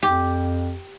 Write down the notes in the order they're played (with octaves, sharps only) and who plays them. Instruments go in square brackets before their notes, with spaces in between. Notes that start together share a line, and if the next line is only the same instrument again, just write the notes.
[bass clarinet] F2 [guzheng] G4